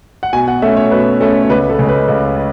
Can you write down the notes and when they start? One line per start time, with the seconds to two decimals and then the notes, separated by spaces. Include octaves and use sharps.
0.23 F#5
0.33 B2 G#5
0.48 F#5
0.62 A3 C#4 E5
0.77 C#5
0.91 B2 B4
1.21 A3 C#4 A4
1.43 C#5
1.50 C#2 B4
1.69 A4
1.79 C#3 G#3
1.89 B4
2.08 C#2